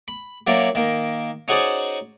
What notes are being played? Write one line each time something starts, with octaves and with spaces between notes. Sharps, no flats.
B5
F#3 A#3 C#4 D5 E5
D#3 A#3
C#4 D#4 F#4 G#4 C5 D5